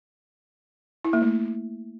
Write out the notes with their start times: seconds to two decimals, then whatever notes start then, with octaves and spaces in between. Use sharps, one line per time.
1.05 E4
1.13 A#3
1.22 A3